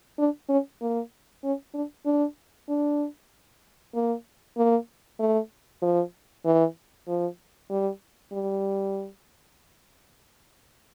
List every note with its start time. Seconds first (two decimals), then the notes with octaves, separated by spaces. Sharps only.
0.18 D4
0.49 C#4
0.81 A#3
1.44 C#4
1.74 D4
2.05 D4
2.69 D4
3.94 A#3
4.57 A#3
5.20 A3
5.82 F3
6.45 E3
7.08 F3
7.70 G3
8.32 G3